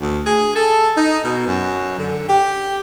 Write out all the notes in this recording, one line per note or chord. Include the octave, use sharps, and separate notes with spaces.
D2
G#4
A4
D#4
B2
F#2
D3
G4